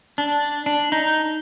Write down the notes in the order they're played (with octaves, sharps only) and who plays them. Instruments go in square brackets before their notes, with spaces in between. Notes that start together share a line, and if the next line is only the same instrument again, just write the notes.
[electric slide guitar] D4
D4
D#4